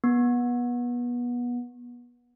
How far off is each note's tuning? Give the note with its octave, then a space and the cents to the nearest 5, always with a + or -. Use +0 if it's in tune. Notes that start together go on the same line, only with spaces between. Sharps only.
B3 -25